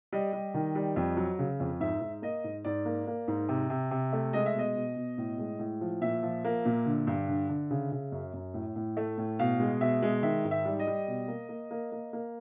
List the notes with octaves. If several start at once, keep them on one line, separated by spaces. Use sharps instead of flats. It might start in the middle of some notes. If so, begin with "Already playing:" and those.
G3 D#5
G3
D#3
G3
F2
F#3
C#3
F2
G#2 E5
G#2
A#3 D#5
G#2
G#2 D5
A#3
A#3
G#2
C3
C3
C3
A3
G#3 D#5
E5
B2 D#5
B2
B2
A2
G#3
A2
F3
A#2 E5
F3
A#3
A#2
D3
G2
D3
D3
C#3
C#3
F#2
F#2
A2
A2
A3
A2
B2 F5
G#3
B2 E5
G#3
D#3 E5
G#2
E5
G3
D#5
G3
B2
A#3
A#3
A#3
A#3
A#3